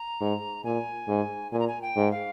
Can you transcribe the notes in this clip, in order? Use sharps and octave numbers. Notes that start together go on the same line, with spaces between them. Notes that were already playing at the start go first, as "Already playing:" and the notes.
Already playing: A#5
G#2
A#2 G#5
G#2
A#2 G#5
A#5
G#5
G5
G#2
F5